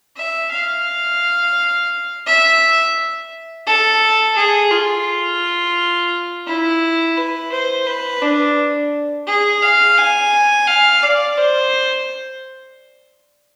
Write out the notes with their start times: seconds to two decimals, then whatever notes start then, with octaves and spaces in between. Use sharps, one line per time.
0.16 E5
0.51 F5
2.26 E5
3.67 A4
4.36 G#4
4.71 F4
6.47 E4
7.17 B4
7.52 C5
7.87 B4
8.22 D4
9.27 G#4
9.62 F5
9.98 G#5
10.67 F5
11.02 D5
11.37 C5